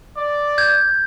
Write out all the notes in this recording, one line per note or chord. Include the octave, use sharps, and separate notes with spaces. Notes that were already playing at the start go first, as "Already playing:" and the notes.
D5
G6 G#6